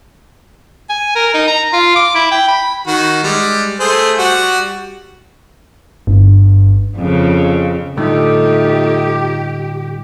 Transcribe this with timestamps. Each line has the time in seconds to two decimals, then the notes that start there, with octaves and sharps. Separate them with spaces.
0.89 G#5
1.15 A#4
1.34 D#4
1.48 A#5
1.73 F4
1.96 D6
2.15 E4
2.31 G5
2.48 B5
2.87 D#3 F#4
3.23 G3 G#3
3.80 A3 G#4 C5
4.18 G3 F#4
6.07 G1 G2
6.97 F2 C#3
7.97 A2 D3 G3 A3 D#4 F4 G4